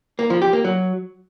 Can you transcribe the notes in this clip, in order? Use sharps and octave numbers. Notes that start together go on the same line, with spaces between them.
A#3
F3
G4
A#3
F#3